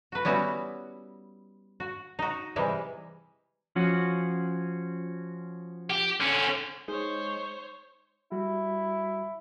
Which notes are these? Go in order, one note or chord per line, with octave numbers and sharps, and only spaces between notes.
F#4 B4
G3 B3 C#4 E4 F#4
F#4
D#4 F#4
C3 E3 G3 G#3
F3 C#4 F#4
G4
D3 C#4
G#3 D#4 C5 C#5
G3 E4 F#4